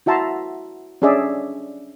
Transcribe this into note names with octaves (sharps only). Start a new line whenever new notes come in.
E4 F#4 E5 A5 A#5 C6
C#4 D4 G#4 D5 E5